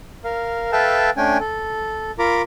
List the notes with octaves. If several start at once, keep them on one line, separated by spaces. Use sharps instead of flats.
A#4 F5
A4 B4 E5 F5 G5 A5
A3 C#4 D4 G5 G#5
A4
F4 A#4 A#5 B5 D6